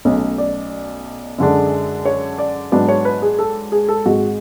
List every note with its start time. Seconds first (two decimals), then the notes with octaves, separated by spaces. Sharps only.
0.05 B1 B2 A3 C#4 C#5
0.38 D5
1.38 F#2 D3 G#3 D4
2.06 C#5
2.38 D5
2.72 G#2 F#3 B3 D4 D5
2.88 C#5
3.05 B4
3.22 G#4
3.39 A4
3.72 G#4
3.89 A4
4.06 G#1 G#2 G#3 F#4